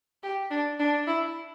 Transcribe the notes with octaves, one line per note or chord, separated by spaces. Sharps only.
G4
D4
D4
E4